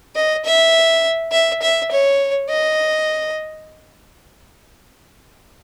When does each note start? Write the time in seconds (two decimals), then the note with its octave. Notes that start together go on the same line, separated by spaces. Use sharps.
0.16 D#5
0.45 E5
1.32 E5
1.62 E5
1.91 C#5
2.49 D#5